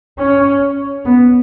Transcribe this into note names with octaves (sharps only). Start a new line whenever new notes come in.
C#4
B3